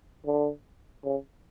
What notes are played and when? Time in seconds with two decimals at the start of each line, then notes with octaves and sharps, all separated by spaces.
0.26 D3
1.04 C#3